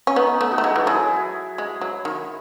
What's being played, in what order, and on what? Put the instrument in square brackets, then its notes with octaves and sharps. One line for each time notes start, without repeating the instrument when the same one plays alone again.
[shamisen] C#4
[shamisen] B3 [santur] D#4
[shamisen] A3
[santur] D#4 F#4
[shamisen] A3
G#3
[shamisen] E3 [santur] A4
[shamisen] F#3 [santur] E4 G#4
[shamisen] G#3
F#3
D#3